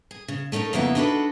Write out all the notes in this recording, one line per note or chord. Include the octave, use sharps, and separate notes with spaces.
G#4
C#3
A3 C#4 D#4 A4 A#4
F2 C#3 A#3 B3 E4 E5
D4 D#4 F#4 G#4 A4 B4